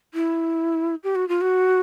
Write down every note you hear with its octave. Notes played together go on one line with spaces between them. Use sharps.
E4
G4
F#4
F4
F#4